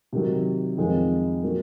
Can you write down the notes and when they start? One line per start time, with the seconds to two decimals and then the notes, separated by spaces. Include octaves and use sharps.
0.13 C3 D#3 F#3
0.77 F2 D#3 G#3 C4 F4
1.43 D#3 F#3 A#3